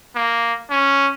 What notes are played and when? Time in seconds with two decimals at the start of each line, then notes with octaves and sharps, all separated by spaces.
0.15 A#3
0.70 C#4